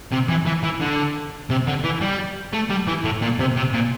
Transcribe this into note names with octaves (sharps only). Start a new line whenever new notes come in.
C3
E3
E3
E3
D3
C3
D3
E3
G3
A3
G3
E3
A2
A#2
C3
C3
A#2